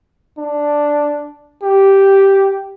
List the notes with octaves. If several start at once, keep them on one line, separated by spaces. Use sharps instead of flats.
D4
G4